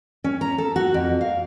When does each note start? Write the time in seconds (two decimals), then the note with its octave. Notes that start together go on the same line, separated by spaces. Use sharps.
0.24 C#4
0.41 A#5
0.58 A4
0.76 F#4
0.94 F2
1.21 F5